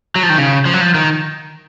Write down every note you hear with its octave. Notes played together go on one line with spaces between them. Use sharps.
F#3
F3
D#3
C#3
F3
F#3
F3
D#3